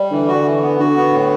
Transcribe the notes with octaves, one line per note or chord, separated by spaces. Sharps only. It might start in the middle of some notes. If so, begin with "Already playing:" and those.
Already playing: G3
D3 E3
F#4
E3
B3
D3 F#4
B3
A2